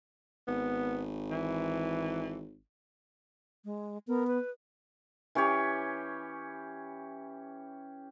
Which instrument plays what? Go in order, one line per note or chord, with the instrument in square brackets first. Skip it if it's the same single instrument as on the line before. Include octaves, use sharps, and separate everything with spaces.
[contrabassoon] G#1 [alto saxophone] B3
[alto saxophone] E3
[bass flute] G#3
[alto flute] B3 [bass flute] A#4
[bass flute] B4
[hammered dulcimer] E3 C#4 G4 C#5